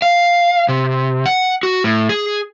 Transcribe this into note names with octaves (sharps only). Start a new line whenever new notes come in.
F5
C3
F#5
F#4
A2
G#4